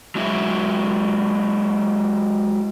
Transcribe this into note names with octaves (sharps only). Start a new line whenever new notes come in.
F#3 G#3 E4 E5